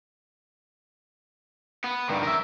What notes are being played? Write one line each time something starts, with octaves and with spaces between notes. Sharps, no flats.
B3
G2 D#3
A#4 E5